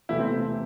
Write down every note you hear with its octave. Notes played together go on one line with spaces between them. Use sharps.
E1 C3 E3 A3 E4
C4